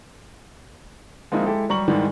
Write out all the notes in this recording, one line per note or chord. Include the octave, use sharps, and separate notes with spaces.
F3 G#3 A#3 C4 D#4 E4
G#3 E4 G4 A4
F#3 G3 A#5 C#6 F#7
G#2 D#3 E3 G3 G#3